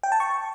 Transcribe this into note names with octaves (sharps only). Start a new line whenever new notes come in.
G5
A5
C#6